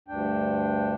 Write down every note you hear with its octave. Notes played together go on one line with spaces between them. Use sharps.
D2 G2 D4 G5